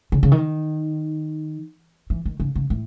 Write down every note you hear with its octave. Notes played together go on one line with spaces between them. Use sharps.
C#3
C#3
D#3
E3
D#3
C#3
C#3
A2